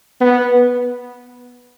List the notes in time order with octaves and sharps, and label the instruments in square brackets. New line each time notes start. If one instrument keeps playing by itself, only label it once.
[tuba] B3